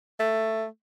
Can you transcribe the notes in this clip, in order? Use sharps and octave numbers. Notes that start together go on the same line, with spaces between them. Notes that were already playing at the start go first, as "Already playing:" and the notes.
A3